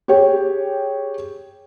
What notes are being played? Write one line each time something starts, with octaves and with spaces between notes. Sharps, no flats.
G4 G#4 C#5 G5